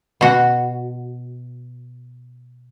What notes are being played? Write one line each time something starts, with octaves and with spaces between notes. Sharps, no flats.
B2 F#4